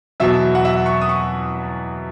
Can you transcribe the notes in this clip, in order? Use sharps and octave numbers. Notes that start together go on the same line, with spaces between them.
E2 B2 F#3 E5
F#5
E5
C#6
D#6
C#6